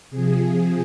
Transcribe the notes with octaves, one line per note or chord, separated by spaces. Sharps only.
C3 F3 G#4